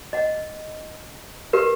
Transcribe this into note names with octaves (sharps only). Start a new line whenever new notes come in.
D#5 F#5
G4 A#4 B4